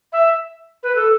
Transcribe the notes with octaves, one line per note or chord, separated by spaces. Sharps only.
E5
B4
A4